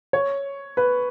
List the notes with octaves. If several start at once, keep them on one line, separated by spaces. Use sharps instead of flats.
C#5
B4